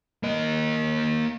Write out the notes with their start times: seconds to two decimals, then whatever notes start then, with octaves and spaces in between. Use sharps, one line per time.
0.23 A#3 D#5